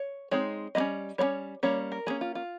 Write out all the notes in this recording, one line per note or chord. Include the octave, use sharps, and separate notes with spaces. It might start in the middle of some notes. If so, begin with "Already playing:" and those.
Already playing: C#5
G#3 C4 D#4 C#5
G3 A#3 D#5
C#4
G3 A#3 C#4 C#5
G3 A#3 C#4 C#5
A#4
G3 A#3 C#4 G#4
F4
F4